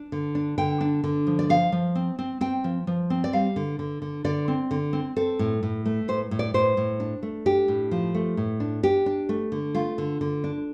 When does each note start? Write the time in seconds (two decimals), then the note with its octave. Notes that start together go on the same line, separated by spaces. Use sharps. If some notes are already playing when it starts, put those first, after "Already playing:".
Already playing: D4
0.12 D3
0.35 D4
0.58 D3 G5
0.81 D4
1.04 D3
1.27 F3
1.39 D5
1.49 F3 F5
1.72 F3
1.95 C4
2.19 C4
2.41 C4 G5
2.64 F3
2.87 F3
3.10 C4
3.24 D5
3.33 G3 F5
3.56 D3
3.79 D3
4.02 D3
4.24 D3 D5
4.48 C4
4.71 D3
4.93 C4
5.16 C4 A4
5.39 A2
5.63 A2
5.86 A3
6.08 A2 C5
6.31 A2
6.39 D5
6.54 A2 C5
6.77 A2
7.00 D4
7.23 A3
7.46 D4 G4
7.68 A2
7.91 F3
8.15 A3
8.37 A2
8.60 D4
8.83 D4 G4
9.06 D4
9.29 A3
9.52 D3
9.75 A3 F4
9.98 D3
10.21 D3
10.44 D4